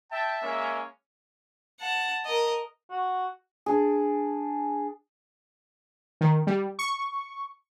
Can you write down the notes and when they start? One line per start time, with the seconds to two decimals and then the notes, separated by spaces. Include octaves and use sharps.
0.11 E5 G5 A5
0.43 G#3 A#3 C#4
1.80 F#5 A5
2.25 A#4 D#5
2.90 F#4
3.66 D4 G#4
6.21 D#3
6.47 G3
6.79 C#6